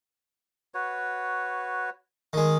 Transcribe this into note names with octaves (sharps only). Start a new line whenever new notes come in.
F#4 B4 C#5
D#3 G#3